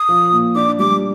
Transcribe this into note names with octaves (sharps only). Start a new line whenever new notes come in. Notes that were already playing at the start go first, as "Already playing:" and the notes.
Already playing: D#6
F3
A#2
D4 D6
G3 D6